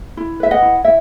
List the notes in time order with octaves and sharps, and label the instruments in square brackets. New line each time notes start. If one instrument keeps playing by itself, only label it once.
[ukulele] E4
B4 E5
D#5 F#5
E4
E4 E5